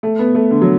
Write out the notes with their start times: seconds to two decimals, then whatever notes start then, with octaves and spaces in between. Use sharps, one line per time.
0.03 A3
0.19 B3
0.35 A3
0.51 D3
0.62 F#3